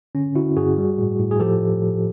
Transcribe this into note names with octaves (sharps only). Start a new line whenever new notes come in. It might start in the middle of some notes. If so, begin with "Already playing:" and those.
D3 C#4
D3 E4 F#4
G2 F#4 G#4
G3
A2
A2
G#4
F3 G4 A4